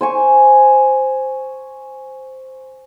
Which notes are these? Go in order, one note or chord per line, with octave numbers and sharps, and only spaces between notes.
C5 G#5 C#6